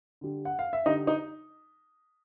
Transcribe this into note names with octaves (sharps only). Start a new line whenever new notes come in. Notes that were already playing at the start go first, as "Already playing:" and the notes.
D3 G3
F#5
F5
E5
D3 G3 D#4 D#5
D#4 D#5